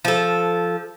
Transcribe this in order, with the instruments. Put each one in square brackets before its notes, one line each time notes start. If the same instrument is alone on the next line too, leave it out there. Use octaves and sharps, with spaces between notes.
[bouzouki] F3 A4